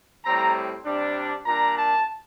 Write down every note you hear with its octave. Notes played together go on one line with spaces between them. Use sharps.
A2 G3 C4 A#5
C3 G3 D4
A#2 G3 D4 A#5
A5